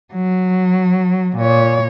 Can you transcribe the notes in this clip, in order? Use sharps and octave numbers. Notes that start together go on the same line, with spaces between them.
F#3
A#2 C#5